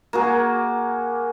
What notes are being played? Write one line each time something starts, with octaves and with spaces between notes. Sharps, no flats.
A#3 F#4 G#4